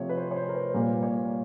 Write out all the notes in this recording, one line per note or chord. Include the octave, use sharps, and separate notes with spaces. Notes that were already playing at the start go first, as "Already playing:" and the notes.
Already playing: C3 F3 A3 C#5
B4
C5
C#5
C5
A#4
B4
B4
A#2 G3 A#3 A#4
C#5